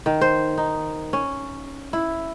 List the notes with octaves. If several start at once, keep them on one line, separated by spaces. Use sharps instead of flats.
D#3
C5
D#4
C#4
E4